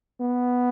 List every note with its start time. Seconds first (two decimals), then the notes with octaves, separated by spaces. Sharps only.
0.21 B3